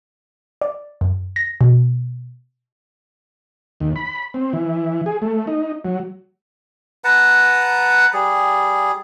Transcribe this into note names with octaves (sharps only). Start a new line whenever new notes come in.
D5
F#2
A#6
B2
D#2
B5
C4
E3
G#4
A3
D#4
F#3
B4 F#5 A5 A#5
G3 G#4